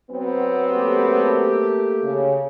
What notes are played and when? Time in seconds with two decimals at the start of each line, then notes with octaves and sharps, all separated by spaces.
0.10 F#3 B3 C4
0.70 A3 A#3 G4
2.03 C#3